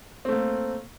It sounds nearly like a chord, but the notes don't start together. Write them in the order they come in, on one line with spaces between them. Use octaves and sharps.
C4 A3 A#3